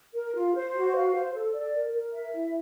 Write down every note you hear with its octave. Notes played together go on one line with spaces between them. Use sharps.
A#4
F4
C5
F#4
F5
C5
A4
D5
A#4
A#4
E5
E4